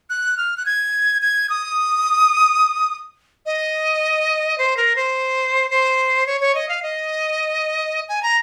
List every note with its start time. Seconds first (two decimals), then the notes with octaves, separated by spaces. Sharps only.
0.10 F#6
0.37 F6
0.57 F#6
0.66 G#6
1.22 G#6
1.50 D#6
3.46 D#5
4.58 C5
4.77 A#4
4.96 C5
5.71 C5
6.27 C#5
6.41 C#5
6.55 D#5
6.69 F5
6.83 D#5
8.09 G#5
8.23 A#5